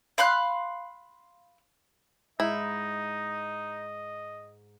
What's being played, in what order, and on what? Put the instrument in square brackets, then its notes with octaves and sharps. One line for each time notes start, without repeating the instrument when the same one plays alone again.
[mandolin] F5 B5 C6 F#6
[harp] G#2 F#6 [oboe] D#4 [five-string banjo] E4 [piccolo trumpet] D#5